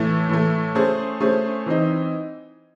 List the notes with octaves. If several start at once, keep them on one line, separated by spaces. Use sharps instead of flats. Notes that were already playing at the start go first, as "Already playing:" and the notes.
Already playing: A2 E3 A3
A2 E3 A3
A3 C#4 G#4 C5
A3 C#4 G#4 C5
E3 C4 D#4